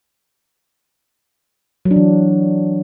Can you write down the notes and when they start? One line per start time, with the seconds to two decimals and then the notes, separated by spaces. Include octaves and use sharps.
1.85 F#3
1.91 D4
1.96 E3